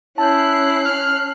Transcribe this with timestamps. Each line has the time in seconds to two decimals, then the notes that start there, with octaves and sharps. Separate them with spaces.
0.18 C#4 E4 A5 F#6 G6 C7
0.85 F6